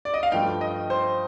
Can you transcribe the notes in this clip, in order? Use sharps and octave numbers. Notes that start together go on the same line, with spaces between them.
D5
D#5
F5
G2 F3 A3 G5
D#5
C5